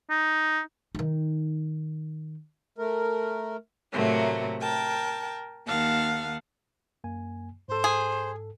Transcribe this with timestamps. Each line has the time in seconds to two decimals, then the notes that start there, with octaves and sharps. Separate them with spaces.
0.10 D#4
0.95 D#3 D#4
2.78 A3 A#4
3.93 A2 C3 F#3 A3 A#3
4.61 A#4 G5 A5
5.67 D#2 D#3 F5 F#5 A5
7.04 F#2 A#3 G#5
7.68 G#2 A4 C5
7.84 G#4